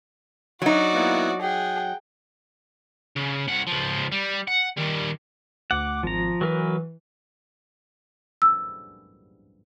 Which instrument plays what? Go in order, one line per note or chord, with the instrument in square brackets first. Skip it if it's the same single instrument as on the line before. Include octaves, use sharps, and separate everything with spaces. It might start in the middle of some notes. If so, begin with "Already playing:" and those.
[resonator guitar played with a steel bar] F#3 D#4 [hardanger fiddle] F#4 D5
[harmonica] A#3 B3 E4
[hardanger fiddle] G#4 [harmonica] F#5 G5
[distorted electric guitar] C#3
C2 F#5
C#2 F3
G3
F#5
D#3 G3
[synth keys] D2 D6 [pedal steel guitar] F#5
[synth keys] G#1 [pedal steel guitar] F3 A#5
[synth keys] E3 [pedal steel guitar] F#3 A#4 B4
[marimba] E6